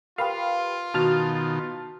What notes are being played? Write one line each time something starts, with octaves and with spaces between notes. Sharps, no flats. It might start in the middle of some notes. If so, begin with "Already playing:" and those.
F4 G4 A#4 B4 F5
B2 D#3 F#4 A5 C#6 F6 A6